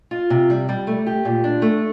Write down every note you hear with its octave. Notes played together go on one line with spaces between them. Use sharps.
F4
C3
G3
G3
A3
G4
A#2
D4
A3